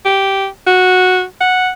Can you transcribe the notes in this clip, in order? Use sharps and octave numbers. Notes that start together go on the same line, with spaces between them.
G4
F#4
F#5